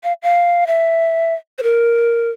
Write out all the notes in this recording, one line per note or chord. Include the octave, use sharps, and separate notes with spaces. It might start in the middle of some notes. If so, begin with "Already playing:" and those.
F5
F5
E5
C5
A#4